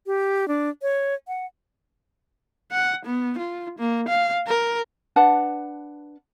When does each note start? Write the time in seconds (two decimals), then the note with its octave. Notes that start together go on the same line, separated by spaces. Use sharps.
0.06 G4
0.48 D4
0.82 C#5
1.28 F#5
2.72 F#5
3.05 B3
3.38 F4
3.79 A#3
4.08 F5
4.47 A#4
5.16 D4 B4 F#5 A5